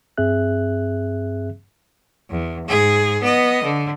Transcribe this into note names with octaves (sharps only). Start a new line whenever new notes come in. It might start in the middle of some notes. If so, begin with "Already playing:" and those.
G2 C4 G#4 E5 F#6
E2
G#2 G#4
B3 D#5
D3